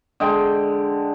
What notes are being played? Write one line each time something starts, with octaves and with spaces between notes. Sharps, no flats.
D3 G#3 G5